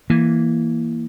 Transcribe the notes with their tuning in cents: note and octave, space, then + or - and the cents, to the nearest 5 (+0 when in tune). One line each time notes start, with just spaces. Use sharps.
E3 +0 A#3 +0